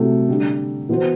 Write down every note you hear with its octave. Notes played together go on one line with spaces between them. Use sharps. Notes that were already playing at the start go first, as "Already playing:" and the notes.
Already playing: C3 F#3 A3 E4
D3 G3 D4
E3 B3 F#4 C5